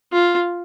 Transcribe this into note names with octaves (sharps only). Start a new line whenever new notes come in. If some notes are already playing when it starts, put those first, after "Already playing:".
F4